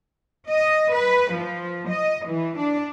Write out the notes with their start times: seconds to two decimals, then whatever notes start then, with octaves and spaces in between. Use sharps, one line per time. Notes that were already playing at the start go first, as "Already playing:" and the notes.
0.49 D#5
0.94 B4
1.34 F3
1.90 D#5
2.28 E3
2.58 D4